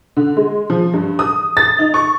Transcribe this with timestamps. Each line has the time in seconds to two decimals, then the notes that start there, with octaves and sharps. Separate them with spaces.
0.17 D3
0.37 G#3
0.70 F3
0.94 G2
1.19 D#6
1.57 A6
1.79 D#4
1.94 C#6